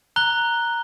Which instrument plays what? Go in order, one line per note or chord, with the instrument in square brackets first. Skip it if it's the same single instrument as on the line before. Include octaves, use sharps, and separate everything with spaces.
[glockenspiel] A#5 F#6 G7